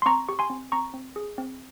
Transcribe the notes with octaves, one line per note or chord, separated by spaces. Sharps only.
C6
C4 A#5 C#6
G4 C#6
G#5 C6
C4
C4 A#5 C#6
C4
G#4
C4